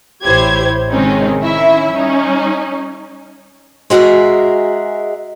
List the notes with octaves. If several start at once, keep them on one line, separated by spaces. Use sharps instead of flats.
A1 E4 G4 C5 C#5 G#6
C3 D#3 G#3 C4 C#4 D#4
D#3 C#4 E4 E5
G3 C#4 D#4
G#3 F#4 G#4 A#4 E5